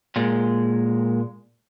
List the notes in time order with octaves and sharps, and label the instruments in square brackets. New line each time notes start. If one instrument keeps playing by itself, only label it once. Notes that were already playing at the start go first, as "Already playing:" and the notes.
[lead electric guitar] A#2 G#3